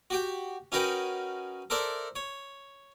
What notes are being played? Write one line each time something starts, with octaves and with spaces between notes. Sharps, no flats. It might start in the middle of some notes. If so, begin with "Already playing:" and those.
F#4 G4 G5
C#4 D#4 F#4 A#4 B4 G5
A4 A#4 C5 D5 E5
C#5